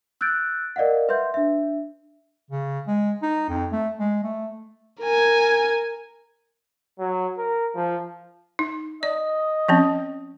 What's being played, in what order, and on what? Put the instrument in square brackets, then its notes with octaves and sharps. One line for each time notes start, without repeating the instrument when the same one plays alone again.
[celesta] E6 F#6 G6 A6 D7
A#4 D5 D#5 F5 F#5
B4 E5 C6 G6
D4 E5
[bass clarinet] C#3
G#3
D#4
F2
A3
G#3
A3
[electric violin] A#4 G#5
[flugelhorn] F#3
A#4
F3
[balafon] D#4
[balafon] D5 [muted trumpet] D#5
[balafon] F3 C4 C#4